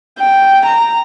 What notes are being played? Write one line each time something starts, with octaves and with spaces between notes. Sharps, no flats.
G5
A#5